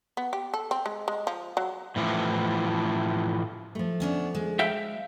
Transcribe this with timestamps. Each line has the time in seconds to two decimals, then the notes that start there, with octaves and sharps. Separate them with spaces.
0.17 B3
0.33 G4
0.54 A4
0.71 C4
0.86 G#3
1.08 G#3
1.27 F3
1.57 F#3
1.96 A2 E3 F3
3.75 F3 A3
4.00 B3 C#4 D4
4.35 G#3
4.59 E5 F5 G5